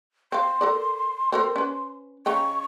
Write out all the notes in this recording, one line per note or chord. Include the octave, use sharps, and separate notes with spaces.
C4 F5 C6
A4 A#4 D5
C4 A4 A#4
C#4 B4
C#3 D#4 G5 C#6